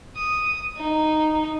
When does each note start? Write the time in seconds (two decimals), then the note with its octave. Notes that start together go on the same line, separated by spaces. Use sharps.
0.16 D#6
0.78 D#4